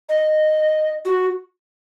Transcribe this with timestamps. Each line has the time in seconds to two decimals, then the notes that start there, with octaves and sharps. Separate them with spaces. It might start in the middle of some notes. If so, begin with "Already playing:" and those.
0.09 D#5
1.05 F#4